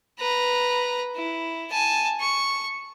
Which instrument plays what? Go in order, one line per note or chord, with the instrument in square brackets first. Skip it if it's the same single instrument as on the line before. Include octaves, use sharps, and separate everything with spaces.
[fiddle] B4 A#5
E4
G#5 A5
C#6